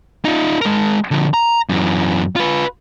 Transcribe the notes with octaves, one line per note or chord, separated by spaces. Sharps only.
D#4 F4
G#3 A#4
D3 F3
A#5
F#2 E3
F4 B4